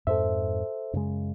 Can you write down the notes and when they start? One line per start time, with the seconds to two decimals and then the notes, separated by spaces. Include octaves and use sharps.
0.07 F2 G#2 A4 C5 E5
0.93 F#2 C#3 G#3